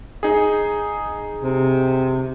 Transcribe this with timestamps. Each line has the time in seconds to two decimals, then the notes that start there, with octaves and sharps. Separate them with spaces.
0.23 D#4 G#4
1.42 C3